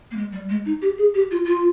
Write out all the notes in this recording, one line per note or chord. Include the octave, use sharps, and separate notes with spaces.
A#3
G#3
G3
G#3
D#4
G4
G#4
G4
F4
F4